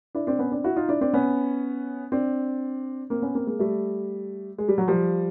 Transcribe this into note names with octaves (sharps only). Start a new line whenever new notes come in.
D4 E4
C4 D4
B3 C#4
C4 D4
E4 F#4
D#4 F4
D4 E4
C4 D4
B3 C#4
C4 D4
A#3 C4
B3 C#4
A#3 C4
G#3 A#3
G3 A3
G#3
G3
F#3
F3 G3